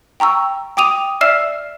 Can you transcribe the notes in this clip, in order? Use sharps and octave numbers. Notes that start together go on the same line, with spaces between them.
G5 A#5 C#6 E6
G5 D6 D#6 D#7 F7
D5 E5 E6 F6 C7 E7